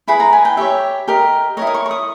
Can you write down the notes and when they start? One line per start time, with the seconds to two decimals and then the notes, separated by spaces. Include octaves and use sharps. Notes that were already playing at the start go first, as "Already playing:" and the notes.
0.08 E4 G#4 B4 B5
0.20 A#5
0.33 G#5
0.45 G5
0.57 G4 C#5 E5
1.08 G4 A#4 D#5
1.57 E4 A#4 C#5 D#5
1.67 D#6
1.74 C#6
1.86 C#6
1.91 D#6